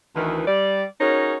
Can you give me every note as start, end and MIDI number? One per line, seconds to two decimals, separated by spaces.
0.15 0.44 38
0.15 0.44 51
0.15 0.44 52
0.46 0.83 55
0.46 0.83 74
1.00 1.35 61
1.00 1.35 63
1.00 1.35 66
1.00 1.35 68
1.00 1.35 70
1.00 1.35 73